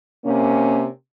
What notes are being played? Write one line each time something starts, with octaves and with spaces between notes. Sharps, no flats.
C3 A#3 C#4